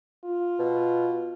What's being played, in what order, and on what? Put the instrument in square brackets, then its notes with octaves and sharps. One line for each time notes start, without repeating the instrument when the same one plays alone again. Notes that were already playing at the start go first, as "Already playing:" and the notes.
[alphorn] F4
[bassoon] B2